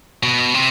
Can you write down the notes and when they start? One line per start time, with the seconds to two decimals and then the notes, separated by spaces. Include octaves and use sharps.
0.23 B2
0.54 C3